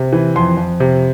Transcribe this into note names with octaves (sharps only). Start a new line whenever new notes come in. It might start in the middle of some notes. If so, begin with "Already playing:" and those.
Already playing: C3
E3
F2 C6
F2
C3